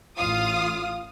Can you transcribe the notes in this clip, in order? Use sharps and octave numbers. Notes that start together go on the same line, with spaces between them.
A1 F4 F5 D#6